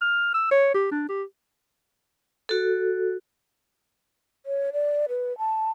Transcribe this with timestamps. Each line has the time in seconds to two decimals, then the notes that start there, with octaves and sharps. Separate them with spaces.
0.02 F6
0.34 E6
0.51 C#5
0.74 G4
0.91 D4
1.09 G4
2.49 F#4 A4
4.46 C#5
4.73 D5
5.09 B4
5.38 A5